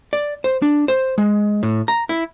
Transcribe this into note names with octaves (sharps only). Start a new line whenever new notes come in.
D5
C5
D4
C5
G#3
A2
A#5
E4